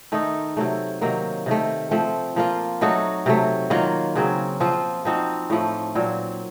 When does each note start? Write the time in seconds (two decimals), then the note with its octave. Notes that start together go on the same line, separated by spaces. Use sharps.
0.12 D#3 A3 D#4
0.57 C3 F#3 A3
1.01 C3 D#3 F#3 A#3
1.46 C3 D#3 A3
1.91 F3 A3 C4
2.36 F3 A#3 F4
2.81 F#3 A3 D#4 F#4
3.26 C3 F#3 A3
3.70 D#3 F#3 A#3 F4
4.15 C#3 F#3 C4
4.60 F3 C4 F4
5.05 F3 C4 D#4 F#4
5.50 A2 F3 A3
5.95 A#2 F#3 C4